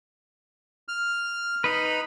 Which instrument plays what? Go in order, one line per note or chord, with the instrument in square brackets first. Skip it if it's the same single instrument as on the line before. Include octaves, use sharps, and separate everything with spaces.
[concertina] F6
[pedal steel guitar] D#4 B4 [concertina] B5